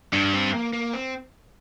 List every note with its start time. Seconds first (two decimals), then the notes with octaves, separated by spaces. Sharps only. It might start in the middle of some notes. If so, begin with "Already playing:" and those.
0.13 G2 D4
0.33 C4
0.53 A#3
0.73 A#3
0.93 C4